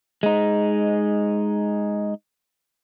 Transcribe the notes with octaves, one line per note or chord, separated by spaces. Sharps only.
G#3 D#4